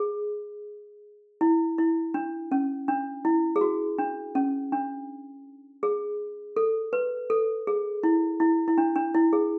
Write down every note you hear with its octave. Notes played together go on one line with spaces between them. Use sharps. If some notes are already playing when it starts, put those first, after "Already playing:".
Already playing: G#4
E4
E4
D4
C#4
D4
E4
G#4
F#4
D4
C#4
D4
G#4
A4
B4
A4
G#4
E4
E4
E4
D4
D4
E4
G#4